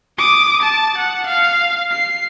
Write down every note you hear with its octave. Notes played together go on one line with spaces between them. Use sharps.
D6 D#6
A5
F#5
F5
C7